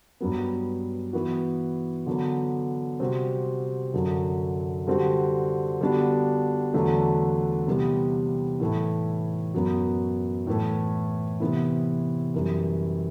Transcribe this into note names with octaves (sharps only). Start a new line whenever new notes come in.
G2 F#3 B3
E3 B3 F#4
D3 F#3 B3
C3 G3 C4 F#4
F#2 D3 F#3
D3 G3 C4 F#4
D3 G3 B3 D4 F#4
E2 D3 F#3 A3 D4
C3 E3 G3 B3
A2 E3 A3 E4
F#2 F#3 B3
A2 E3 A3
C3 E3 B3 E4
F#2 E3 G3